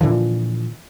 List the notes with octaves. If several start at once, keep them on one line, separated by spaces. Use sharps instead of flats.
A#2 D3 E3 F3